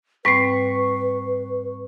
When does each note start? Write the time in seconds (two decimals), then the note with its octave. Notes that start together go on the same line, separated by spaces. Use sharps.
0.25 G#2 G3 C4 B4 C#6 B6 C7